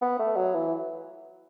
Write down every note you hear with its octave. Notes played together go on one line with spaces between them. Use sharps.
B3
A3
F#3
E3